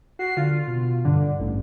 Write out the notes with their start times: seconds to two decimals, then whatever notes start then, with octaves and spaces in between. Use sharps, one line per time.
0.19 F#4 C7
0.37 D3 F4
0.67 B2
1.05 G2 D3
1.39 A1